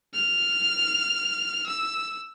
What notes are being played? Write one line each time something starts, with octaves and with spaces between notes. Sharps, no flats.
F6
E6